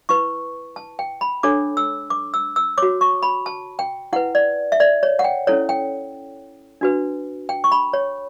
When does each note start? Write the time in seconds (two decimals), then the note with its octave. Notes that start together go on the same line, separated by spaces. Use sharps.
0.09 E4 B4 C#6
0.76 A5
0.99 G5
1.21 B5
1.43 D4 A4 C#5 D6
1.77 E6
2.10 D6
2.34 E6
2.56 E6
2.78 F#4 C#5 D6
3.01 C#6
3.23 B5
3.46 A5
3.79 G5
4.13 E4 F#5
4.16 B4
4.35 D5
4.72 E5
4.80 D5
5.03 C#5
5.19 F#5
5.24 G5
5.47 C#4 E4 A4 C#5
5.69 G5
6.81 D4 F#4 B4
7.49 G5
7.64 C#6
7.72 B5
7.93 C#5